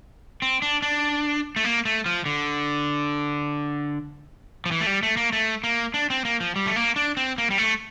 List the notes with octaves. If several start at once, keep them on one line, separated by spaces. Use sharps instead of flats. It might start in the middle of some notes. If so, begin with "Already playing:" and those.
C4
D4
D4
A3
A#3
A3
F3
D3
F3
E3
A3
G3
A3
A#3
A3
A#3
D4
C4
A#3
F3
G3
A3
A#3
D4
C4
A#3
G3
A3